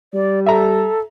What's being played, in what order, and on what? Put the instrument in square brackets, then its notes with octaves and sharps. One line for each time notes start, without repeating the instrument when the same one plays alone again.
[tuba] G3 [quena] D5
[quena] A4 [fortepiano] E5 A#5